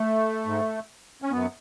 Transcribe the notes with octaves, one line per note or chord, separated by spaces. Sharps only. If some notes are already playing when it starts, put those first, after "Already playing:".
Already playing: A3
G#2
C#4
F#2 B3